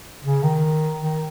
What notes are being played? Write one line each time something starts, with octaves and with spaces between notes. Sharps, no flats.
C#3
D#3
D#3